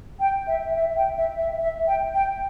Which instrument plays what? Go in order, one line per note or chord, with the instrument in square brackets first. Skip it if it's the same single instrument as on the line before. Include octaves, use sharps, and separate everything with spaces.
[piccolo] G5
E5
E5
G5
E5
E5
E5
G5
G5